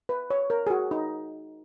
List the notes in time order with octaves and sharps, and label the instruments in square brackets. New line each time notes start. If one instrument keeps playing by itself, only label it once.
[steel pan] B4
C#5
A#4
G#4
F#4
D#4